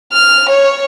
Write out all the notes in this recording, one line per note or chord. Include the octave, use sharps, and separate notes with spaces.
F6
C#5